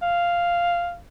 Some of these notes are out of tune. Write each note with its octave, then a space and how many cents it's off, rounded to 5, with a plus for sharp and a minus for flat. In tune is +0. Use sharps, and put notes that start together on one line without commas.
F5 -5